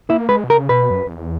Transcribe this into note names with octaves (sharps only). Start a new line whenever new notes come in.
A#3 E4
G#3 B4
B2
C#3 A#4
B2 B4
F#2
F#2
E2